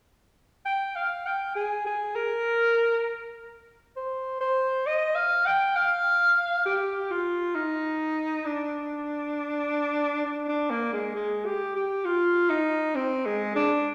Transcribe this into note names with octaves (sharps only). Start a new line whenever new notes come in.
G5
F5
G5
G#4
G#4
A#4
C5
C5
D#5
F5
G5
F5
G4
F4
D#4
D4
D4
D4
A#3
G#3
G#3
G4
G4
F4
D#4
C4
G#3
D4